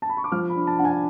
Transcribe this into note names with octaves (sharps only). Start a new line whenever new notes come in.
A5
B5
C#6
D6
F3 F6
B5
D4
A5
D4 F#5
G#5